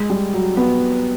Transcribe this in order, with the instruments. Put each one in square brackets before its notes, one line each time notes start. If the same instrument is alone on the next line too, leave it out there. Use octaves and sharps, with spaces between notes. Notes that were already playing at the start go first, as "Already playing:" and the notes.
Already playing: [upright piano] G#3
G3
F#3
B3